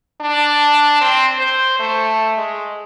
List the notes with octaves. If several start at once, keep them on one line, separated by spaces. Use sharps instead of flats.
D4
C4
C5
A3
G#3